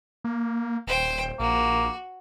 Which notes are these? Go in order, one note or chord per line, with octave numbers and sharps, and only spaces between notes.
A#3
D#1 C5 G5
A#1 A#3 F#4